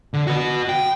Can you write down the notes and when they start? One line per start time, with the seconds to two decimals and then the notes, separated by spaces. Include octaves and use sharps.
0.14 D3
0.27 F#4 B4
0.69 G5